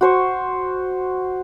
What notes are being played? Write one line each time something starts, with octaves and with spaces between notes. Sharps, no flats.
F#4 C5 C#6